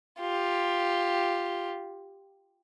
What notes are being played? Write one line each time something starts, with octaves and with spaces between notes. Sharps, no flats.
F4 G4